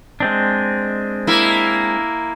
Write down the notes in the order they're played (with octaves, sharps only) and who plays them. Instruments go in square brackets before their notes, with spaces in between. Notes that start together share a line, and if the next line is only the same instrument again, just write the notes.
[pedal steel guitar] G#3 C4 D4
[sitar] A#3 E4